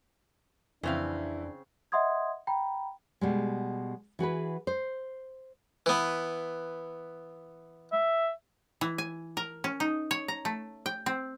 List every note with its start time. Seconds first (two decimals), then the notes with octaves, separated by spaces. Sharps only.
0.83 F2 C#3 E3 C4 D4 E4 F5
1.92 D#5 E5 F#5 C6 D#6 G#6
2.47 G5 A#5 B5
3.21 B2 G3 G#3
4.19 E3 F#4 G#4 B4
4.67 C5
5.86 E3 B3
7.93 E5
8.81 E3
8.98 G#5
9.37 A#4
9.64 C#4
9.80 D#4
10.11 C#5
10.28 A#5
10.45 A3
10.86 G5
11.06 C4